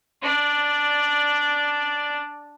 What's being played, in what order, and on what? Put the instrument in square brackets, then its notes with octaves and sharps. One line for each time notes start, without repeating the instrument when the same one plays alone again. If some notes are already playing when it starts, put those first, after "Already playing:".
[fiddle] D4 D5